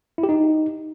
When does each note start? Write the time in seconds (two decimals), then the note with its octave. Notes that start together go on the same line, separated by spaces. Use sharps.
0.18 E4
0.23 G4
0.29 D#4